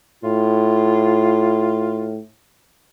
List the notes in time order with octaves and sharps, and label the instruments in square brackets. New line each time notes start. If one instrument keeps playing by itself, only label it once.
[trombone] A2 [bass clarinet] F4